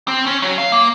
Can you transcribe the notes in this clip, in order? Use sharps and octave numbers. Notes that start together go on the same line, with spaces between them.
C4
C#4
F#3
F5
A#3